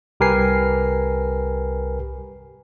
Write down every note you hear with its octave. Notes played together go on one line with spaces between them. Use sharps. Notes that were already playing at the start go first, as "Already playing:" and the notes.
C2 G4 A#4 B4 G#5 C7